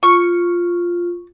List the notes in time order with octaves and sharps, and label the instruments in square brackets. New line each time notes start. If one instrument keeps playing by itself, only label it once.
[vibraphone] F4 [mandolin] C#6